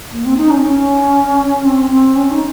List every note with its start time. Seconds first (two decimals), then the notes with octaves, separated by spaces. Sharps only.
0.12 A#3
0.25 C4
0.37 D#4
0.51 C#4
0.58 C4
0.64 C#4
1.65 C4
1.90 C4
2.16 C#4
2.31 D#4